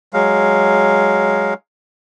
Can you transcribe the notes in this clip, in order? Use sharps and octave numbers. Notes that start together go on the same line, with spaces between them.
F#3 G#3 F5